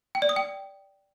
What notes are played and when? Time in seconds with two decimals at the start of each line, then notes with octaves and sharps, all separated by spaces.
0.15 G5
0.22 D5
0.29 D#6
0.36 G5